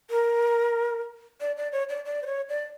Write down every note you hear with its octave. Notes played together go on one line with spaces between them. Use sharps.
A#4
D5
D5
C#5
D5
D5
C5
C#5
D5